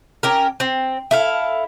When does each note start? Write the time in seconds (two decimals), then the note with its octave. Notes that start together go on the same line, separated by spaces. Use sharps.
0.23 C#4 G4 A#4
0.60 C4
1.11 E4 A4 F5